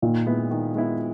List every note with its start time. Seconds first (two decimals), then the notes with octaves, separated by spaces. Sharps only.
0.02 A#2 D#3
0.26 G#3 B3 E4
0.51 D#3
0.75 G#3 B3 E4